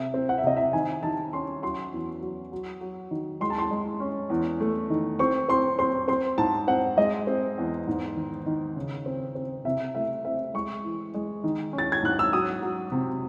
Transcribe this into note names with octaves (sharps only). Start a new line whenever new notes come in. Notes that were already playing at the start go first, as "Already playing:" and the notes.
Already playing: C3 E5
C4
F#5
E5
C3 D#5
E5
D#3 G#5
D#3 A5
C#4 C6
F#3 C6
E2
F#3
F#3
F#3
D#3
G#3 C6
A5
C6
G#3
C#4
E2
A3
D#3
C4 C#6
C4 C6
C4 C6
C4 C6
G#2 A5
C4 F#5
G#3 D#5
C4
E2
G#2
D#3
D#3
C#3
C4
C4
C3 E5
A3 E5
C4 E5
G#3 C#6
E3
G#3
D#3
C#4
A6
G#6
G#2 F#6
E6
F#3 D#6
F#3
C3